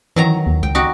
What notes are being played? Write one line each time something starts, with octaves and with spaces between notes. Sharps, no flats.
D#3 E3 F#3 A#5
D#2
C#2 G5
D#4 F#4 G4